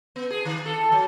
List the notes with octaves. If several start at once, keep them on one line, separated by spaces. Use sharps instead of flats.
B3
G#4
D#3
A4
F#3